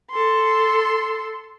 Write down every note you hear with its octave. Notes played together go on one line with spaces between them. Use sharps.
A4 C6